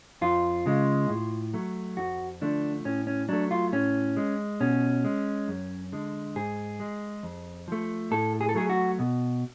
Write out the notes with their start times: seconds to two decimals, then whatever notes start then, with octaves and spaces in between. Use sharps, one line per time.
0.21 F2 F4
0.66 C#3 G#3
1.10 A2
1.54 F#3 A3
1.97 F2 F#4
2.41 D3 F3 A3 D4
2.85 A2 C#4
3.07 C#4
3.29 F#3 A3 D4
3.51 F4
3.73 A2 C#4
4.17 G#3
4.60 B2 C#4
5.04 G#3
5.48 F#2
5.92 D3 G#3
6.36 G#2 G#4
6.80 G#3
7.23 F2
7.68 F3 A3
8.11 A2 A4
8.41 G#4
8.49 A4
8.55 F#3 A3 G#4
8.70 F#4
8.99 B2